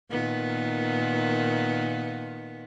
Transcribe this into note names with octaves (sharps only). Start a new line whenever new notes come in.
A#2 D#3 B3